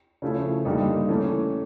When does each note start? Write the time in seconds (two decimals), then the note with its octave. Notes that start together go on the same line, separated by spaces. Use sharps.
0.22 C#3 F3 A3 C#4 E4
0.65 G2 D3 G3 A#3 D#4
1.09 E3 A3 C#4